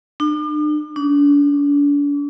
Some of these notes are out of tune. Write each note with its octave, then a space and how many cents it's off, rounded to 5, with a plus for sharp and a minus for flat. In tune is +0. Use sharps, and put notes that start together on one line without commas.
D4 +45
D4 -40